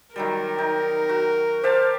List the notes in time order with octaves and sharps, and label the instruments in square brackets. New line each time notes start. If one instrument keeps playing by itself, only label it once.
[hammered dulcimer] D#3 F#3 G3 [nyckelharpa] A#4
[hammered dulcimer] D#4
F#4
[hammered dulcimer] G4 F5 A5 [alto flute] C5